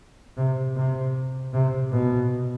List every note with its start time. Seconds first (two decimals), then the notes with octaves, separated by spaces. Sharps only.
0.37 C3
0.76 C3
1.53 C3
1.92 B2